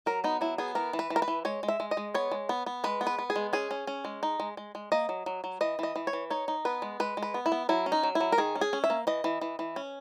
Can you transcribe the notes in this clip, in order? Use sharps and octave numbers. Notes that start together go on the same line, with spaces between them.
F#3 A#4
B3 D#4
F#3 E4
B3 G#4
E3 A#4
E3
B4
E3
A#4
B4
E3
G#3 C#5
G#3
E5
G#3
D#5
G#3
B3 C#5
G#3
B3
B3
G#3 B4
B3
B4
B3
G#4
G#3
C#4 G#4
C#4
C#4
G#3
D#4
G#3
G#3
G#3
A#3 D#5
F#3
F#3
F#3
E3 D#5
E3 D#5
E3
C#5
E3
D#4 C#5
D#4
B3 B4
G#3
G#3 B4
G#3
B4
B3
E4
B3
F#3 E4
C#4
D#4
F#3
E4
F#3
A#4
D#3 G#4
C#4
G#4
C#4
E5
A#3
E3 D#5
E3
E3
E3
C#4